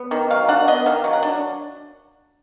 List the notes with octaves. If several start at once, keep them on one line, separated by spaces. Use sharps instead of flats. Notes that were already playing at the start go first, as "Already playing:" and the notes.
Already playing: B3
D#3
F#3 F5
D4 F#5
B3 D#5
D#3 F5
F#3
F#5
D4